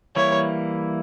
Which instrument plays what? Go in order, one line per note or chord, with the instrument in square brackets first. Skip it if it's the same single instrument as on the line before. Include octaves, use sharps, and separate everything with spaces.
[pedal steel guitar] E3 G3 A#3 E4 [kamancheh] C#5